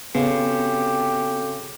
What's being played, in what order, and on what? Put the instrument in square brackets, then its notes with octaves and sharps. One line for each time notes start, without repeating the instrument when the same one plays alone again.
[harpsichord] C#3 [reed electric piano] B3 [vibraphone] C4 F#4 A4 [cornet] G4